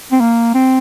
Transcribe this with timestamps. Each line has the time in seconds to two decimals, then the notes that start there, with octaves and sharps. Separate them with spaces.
0.12 C4
0.20 A#3
0.54 C4